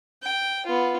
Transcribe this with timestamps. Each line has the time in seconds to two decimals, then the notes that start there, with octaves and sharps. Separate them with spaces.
0.22 G5
0.66 B3 F4